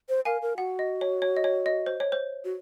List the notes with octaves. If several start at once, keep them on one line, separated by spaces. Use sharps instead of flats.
C5
A#4 F5 G#5
A#4
F#4 F#5
D#5
C#5
C#5
D#5
C#5
D#5
C5
C#5
C5
F#4